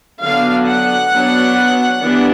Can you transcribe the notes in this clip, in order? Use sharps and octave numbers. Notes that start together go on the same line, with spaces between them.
D3 F#3 B3 D4 F5
F#5
F#3 B3 D4
E3 G3 B3 D4